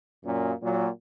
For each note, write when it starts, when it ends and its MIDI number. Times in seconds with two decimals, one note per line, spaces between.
0.24 0.52 42
0.24 0.52 46
0.62 0.88 46
0.62 0.88 54